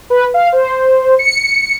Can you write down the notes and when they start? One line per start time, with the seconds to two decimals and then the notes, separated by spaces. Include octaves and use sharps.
0.10 B4
0.34 F5
0.52 C5
1.19 C#7